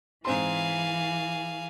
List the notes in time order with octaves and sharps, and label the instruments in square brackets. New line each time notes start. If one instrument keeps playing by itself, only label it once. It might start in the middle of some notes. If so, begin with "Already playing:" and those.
[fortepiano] G#2 C4 C6 [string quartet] E3 [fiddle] G#4 F5